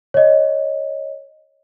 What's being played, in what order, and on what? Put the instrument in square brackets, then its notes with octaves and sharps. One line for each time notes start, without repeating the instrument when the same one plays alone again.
[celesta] C#5 D#5